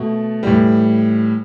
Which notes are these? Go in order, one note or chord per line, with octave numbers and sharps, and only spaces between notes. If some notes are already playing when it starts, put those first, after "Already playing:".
Already playing: B2 A3
A2 E3 G3